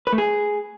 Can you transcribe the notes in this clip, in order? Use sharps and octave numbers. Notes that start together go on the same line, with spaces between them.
B4
A3
G#4